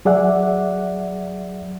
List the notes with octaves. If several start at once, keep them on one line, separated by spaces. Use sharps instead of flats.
F#3 G#4 D5 E5 F#5